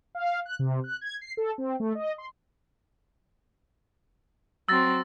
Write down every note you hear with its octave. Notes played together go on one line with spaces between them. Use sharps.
F5
F#6
C3
F#6
G#6
C7
A4
C4
A3
D#5
C6
F#3 C4 E6 A6 A#6